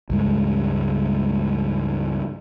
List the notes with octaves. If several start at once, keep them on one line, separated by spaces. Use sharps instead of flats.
C#2 G2 G#3